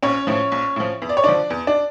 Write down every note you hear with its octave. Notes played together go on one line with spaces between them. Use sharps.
A#1 C#4 C#5
A2 F3
A#1
A2 F3
E2
D5
C#5
D3 F3 D4 D5
E2
D4 D5